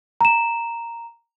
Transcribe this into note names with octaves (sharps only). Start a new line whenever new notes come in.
A#5 E7